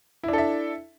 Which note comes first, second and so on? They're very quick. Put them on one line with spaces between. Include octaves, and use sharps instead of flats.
E4 D4 A4 E5